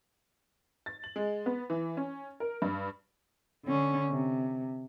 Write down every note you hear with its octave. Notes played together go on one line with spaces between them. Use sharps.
A6
F#7
G#3
B3
E3
C#4
A#4
G2
D3 C#4
C3